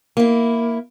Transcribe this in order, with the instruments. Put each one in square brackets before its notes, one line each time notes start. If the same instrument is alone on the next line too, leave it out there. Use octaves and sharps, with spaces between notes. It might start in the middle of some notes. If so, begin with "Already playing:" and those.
[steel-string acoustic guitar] A#3 E4